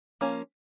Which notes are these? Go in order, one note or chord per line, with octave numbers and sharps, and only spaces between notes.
F3 A#3 C#4